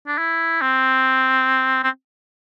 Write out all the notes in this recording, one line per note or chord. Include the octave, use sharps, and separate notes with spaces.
D4
E4
C4
C4